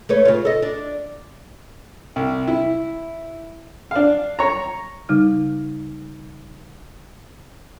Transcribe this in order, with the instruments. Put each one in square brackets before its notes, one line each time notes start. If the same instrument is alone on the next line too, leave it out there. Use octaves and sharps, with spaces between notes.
[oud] A3 B4 C#5
C#3 F4
A4 D#5
D4
[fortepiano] C2
E4
D4 F5
C#5 A#5
[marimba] C#3 G3 D#4 F6